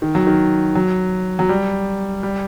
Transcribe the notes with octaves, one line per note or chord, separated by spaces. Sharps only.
D#3
F#3
D#3
F#3
F#3
G3
G3